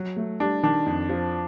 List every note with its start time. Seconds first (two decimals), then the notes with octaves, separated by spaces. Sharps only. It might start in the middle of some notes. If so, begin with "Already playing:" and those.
Already playing: F#3
0.16 A3
0.40 G3 D4
0.63 D#3 D4
0.86 F2
1.09 F3